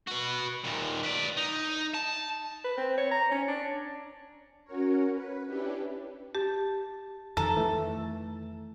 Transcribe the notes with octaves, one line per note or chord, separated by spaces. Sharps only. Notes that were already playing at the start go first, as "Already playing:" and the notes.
F#4 B4
D#2 A#2
B4 D5
D#4
A5
B4
C4
C#5
A#5
C#4
D4
C#4 F#4 A#4 C#5
B4
C#4 D4 E4 G4 B4
G4 A5
F2 D#3 F3 A4 A#5
E3 A3